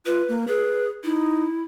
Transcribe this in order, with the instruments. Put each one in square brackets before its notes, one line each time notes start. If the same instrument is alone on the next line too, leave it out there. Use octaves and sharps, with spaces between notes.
[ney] F4 [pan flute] B4
[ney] A#3
[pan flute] G#4 [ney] B4
[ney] D#4 [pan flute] E4